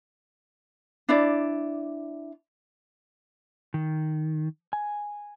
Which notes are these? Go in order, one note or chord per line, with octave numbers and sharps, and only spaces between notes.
D4 E4 D5
D#3
G#5